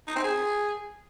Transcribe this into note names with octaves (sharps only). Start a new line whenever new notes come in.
D#4
C4
G#4